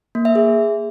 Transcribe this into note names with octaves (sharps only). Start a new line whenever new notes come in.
A#3
E5
G#4